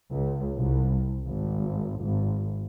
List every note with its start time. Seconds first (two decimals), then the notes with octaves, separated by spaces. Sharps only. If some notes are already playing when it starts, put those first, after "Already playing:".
0.13 C#2
0.56 C2
1.27 G#1
2.00 G#1